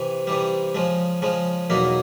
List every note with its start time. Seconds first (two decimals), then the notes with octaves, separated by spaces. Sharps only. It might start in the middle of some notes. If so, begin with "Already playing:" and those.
Already playing: C3 E3
0.27 C3 E3 G3
0.75 C#3 F3 G#3
1.22 C#3 F3 G#3
1.70 E2 B2 F#3 A#3 D#4